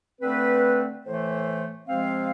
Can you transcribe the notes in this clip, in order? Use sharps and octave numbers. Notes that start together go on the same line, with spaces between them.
D3 A3 C4 B4
A2 E3 A3 C5
C3 F3 G#3 C4 F5